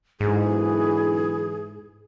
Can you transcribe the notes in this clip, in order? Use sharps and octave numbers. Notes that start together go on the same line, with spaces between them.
B1 G#2 D3 E3 G#4